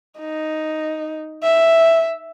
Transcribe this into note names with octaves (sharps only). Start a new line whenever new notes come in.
D#4
E5